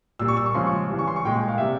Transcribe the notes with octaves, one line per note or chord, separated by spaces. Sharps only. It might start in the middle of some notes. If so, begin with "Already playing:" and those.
A#2 G3 E6
C#6
E6
C#6
C#3 F3 G#3 C6
C#6
C#3 E3 G3
C#6
C6
C#6
A#2 G#3 G5
G5
F5
C3 G3 E5